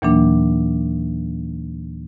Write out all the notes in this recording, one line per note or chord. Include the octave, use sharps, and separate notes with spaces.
D#2 A#2 E3 F#3 A#3 D4